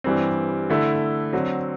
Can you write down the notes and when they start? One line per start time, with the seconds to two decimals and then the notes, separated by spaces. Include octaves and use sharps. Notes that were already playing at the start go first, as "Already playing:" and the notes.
0.04 G2 E3 G3 C4
0.70 D3 A3 E4
1.33 D3 F#3 C4